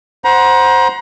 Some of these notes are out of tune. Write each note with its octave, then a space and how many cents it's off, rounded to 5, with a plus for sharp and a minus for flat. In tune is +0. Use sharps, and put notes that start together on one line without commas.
C5 +0 F#5 +0 A#5 +35